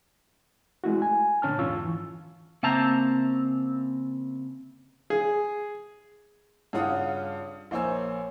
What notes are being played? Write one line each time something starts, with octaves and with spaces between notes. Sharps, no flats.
G#3 A3 E4 F#4
G#5
A#2 D3 C#4 A5 F6
E2 G#2 F4 C#6 E6
E3
C#3 A#3 C4 E5 A5 A#5
G#4
G2 C#3 C#4 F4 F#5 D#6
A#1 A#3 C5 C#5 G#5 E6